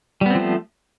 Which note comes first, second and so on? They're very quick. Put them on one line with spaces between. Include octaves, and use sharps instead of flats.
G3 B3 C4 F3 A3